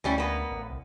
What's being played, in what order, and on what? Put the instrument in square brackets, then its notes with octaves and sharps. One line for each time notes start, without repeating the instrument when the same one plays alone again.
[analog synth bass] D2 [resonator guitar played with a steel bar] E3 G3 C#4
[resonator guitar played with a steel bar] A#3 B3
[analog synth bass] A1
C2